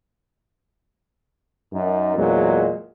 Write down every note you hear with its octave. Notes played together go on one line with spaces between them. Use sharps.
F#2 D#4
E2 A#2 F#3 G#3